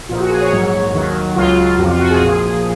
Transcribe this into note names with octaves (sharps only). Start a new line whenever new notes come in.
A#1 A#2 F3 F4
F#4
G#4
C#5
A#1 G#2 F#3
D#2 D#3 F#3
C#2 C#3 F#3 F4
F2 C3 F3 F#4
F4
F#4
G#4
A#1 A#2 F3 G#4